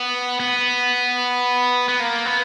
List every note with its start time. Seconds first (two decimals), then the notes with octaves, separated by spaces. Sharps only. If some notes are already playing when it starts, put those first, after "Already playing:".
Already playing: B3
0.40 B3
1.89 B3
2.00 A#3
2.26 B3